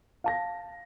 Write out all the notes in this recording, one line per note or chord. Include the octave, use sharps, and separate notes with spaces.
F5 A5 A#6